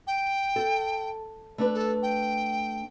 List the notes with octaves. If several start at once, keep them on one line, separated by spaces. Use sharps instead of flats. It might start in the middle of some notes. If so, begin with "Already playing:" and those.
G5
A4
A3 D4 B4
A4
G5